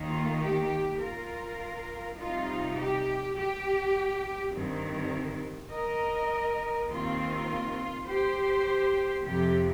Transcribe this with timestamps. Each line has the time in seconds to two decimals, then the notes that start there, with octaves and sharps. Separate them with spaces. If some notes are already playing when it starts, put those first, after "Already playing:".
Already playing: D#2 D#3 A#3 D#4
0.11 F4
0.40 G4
0.99 F4 A#4
2.17 C3 G3 D#4 F4
2.76 G4
3.36 G4
4.54 G2 D#3 C4
5.71 A#4 D#5
6.89 D#2 D#3 C4 F4
8.07 G4 C5
9.24 F2 C3 F3 G4